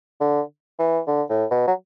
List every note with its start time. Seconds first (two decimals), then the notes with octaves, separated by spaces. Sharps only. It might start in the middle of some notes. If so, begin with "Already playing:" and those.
0.21 D3
0.79 E3
1.07 D3
1.30 A2
1.51 B2
1.67 F#3